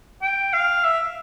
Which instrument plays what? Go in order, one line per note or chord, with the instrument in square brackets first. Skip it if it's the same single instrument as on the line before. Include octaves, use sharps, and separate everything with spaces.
[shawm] G5
F5
E5